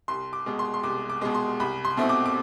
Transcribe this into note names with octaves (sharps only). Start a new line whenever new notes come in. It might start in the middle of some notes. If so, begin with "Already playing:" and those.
C2 C6
D6
B2 G#3
C6
C6
C2 D6
D6
B2 G#3
C6
C2 B5
C6
B2 A3 C4 E4
D6
D6